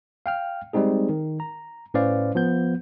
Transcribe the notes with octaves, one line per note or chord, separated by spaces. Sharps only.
F5 G5 F6
G3 G#3 C4 D#4 G#4
D#3
A#5
A2 C#4 B4 C5 D5 F5
F3 B3 G6